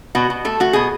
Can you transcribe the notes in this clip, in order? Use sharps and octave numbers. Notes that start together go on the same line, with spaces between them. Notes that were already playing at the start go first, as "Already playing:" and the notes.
B2 F#4
B2
A3 A4
A3 F#4
B2 G#4